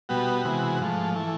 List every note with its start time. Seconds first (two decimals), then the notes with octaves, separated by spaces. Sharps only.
0.09 B2 G3 B3 F#4
0.44 C3 E3 G#3 B3
0.80 G#2 F3 A3
1.14 E3 A3